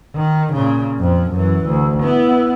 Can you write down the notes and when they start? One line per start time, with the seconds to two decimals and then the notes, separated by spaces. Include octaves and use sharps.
0.15 D#3
0.53 A#2 C#3
0.99 F2 F3
1.32 F#2 E3
1.66 D2
2.03 B3 E4